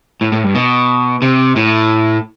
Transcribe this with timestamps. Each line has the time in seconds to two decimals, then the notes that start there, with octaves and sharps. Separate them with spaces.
0.21 A2
0.32 A2
0.44 G2
0.55 B2
1.22 C3
1.56 A2